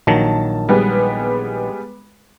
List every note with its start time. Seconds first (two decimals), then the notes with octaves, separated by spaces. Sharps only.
0.07 A#1 D#3 F#3 A5
0.69 G3 G#3 B3